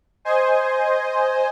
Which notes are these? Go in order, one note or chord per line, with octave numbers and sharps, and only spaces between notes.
C5 D#5 G#5